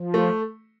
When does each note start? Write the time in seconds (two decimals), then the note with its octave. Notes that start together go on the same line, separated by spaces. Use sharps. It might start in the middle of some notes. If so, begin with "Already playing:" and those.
Already playing: F3
0.14 A3